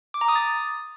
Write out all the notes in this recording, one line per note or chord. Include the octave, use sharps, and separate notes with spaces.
D6
A#5
D#6
A6